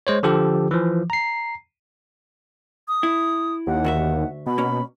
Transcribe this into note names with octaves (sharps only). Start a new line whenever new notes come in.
G#3 C5 C#5
D3 F3 G4 A4
E3 F3
A#5 C7
D#6
E4
D#2 F#5
D2 F#4 E5
B2 B5
A#3 C#4